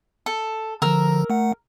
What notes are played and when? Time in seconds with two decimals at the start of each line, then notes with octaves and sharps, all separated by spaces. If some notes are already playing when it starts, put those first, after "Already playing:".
0.26 A4
0.82 D3 F3 A#4 E6
1.30 A3 F#5